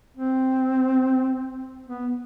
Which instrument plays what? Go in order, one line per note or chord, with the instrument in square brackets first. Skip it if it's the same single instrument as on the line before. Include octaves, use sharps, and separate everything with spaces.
[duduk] C4
B3